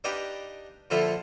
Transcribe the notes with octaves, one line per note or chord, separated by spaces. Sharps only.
D4 D#4 G4 B4 F5 D6
A#2 D3 F3 E4 F4 A4